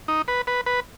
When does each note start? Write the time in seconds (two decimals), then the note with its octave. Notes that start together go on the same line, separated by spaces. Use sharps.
0.08 D#4
0.28 B4
0.47 B4
0.66 B4